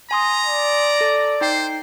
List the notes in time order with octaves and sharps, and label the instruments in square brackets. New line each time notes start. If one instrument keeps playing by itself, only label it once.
[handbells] G#5 C6 D#6 [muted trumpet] A#5
[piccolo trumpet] D5
[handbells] A4
[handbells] D#4 G5 C7 [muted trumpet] C5